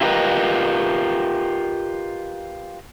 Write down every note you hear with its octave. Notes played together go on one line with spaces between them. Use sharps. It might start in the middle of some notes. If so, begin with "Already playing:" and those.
E4 F4 G4 A#4 B4 D#5